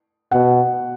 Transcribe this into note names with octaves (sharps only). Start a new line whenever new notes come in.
B2 F#5